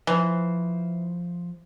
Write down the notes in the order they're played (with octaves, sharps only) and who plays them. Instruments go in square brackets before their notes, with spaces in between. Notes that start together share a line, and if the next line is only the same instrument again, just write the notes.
[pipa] E3 [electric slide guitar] F3 C5